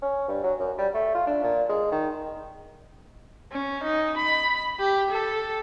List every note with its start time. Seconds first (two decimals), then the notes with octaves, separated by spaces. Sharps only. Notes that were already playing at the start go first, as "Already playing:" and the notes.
0.02 C#4
0.28 G2
0.44 F#3
0.60 F#2
0.78 G3
0.94 A3
1.14 F4
1.27 D4
1.43 A#2
1.69 G#3
1.92 D#3
3.52 C#4
3.84 D#4
4.17 B5
4.79 G4
5.11 A4